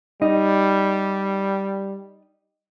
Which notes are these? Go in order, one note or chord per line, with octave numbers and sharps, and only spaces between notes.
G3 D#4